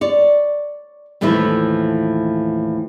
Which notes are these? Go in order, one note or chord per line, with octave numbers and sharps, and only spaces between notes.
C#5 D5
D#2 A2 E3 F3 A3 E4